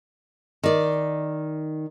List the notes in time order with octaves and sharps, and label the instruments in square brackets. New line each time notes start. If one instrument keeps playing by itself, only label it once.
[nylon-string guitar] D#3 D5